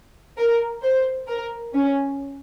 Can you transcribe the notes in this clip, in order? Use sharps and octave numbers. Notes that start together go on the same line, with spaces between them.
A#4
C5
A#4
C#4